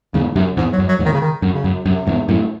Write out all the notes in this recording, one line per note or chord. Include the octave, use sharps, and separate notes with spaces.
E2 G#2 C#3
F#2 C3
E2 G#2
F#3
F#2
F#3
E2 G#2
D#3
C#3
D#3
F#2
C#3
F#2
F#2 C3
E2 G#2
F#2 A2